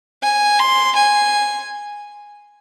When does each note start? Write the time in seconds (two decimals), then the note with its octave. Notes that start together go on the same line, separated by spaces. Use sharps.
0.23 G#5
0.59 C6
0.96 G#5